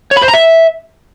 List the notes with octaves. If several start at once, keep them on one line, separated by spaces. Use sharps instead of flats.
C#5
B5
C5
A#5
E5